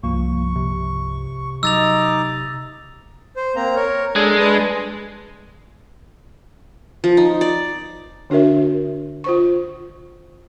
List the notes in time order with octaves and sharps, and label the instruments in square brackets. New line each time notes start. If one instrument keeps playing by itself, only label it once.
[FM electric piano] C2 G2 F3 [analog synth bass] A#3 [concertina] C#6
[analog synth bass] C3
[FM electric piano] F#3 [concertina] D#4 D#5 D6 [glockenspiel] E6 A6 F7
[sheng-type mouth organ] C5
A#3 C4 A#5
A#4 C#5
[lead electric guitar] G#3 [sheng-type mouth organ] D4 A4
[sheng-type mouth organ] D4 B4 A5
[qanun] F3
D#4
D5
[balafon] D3 D4 F#4 A#4 E5
F4 C5 C#6